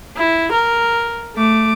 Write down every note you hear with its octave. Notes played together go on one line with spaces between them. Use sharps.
E4
A#4
A3 D6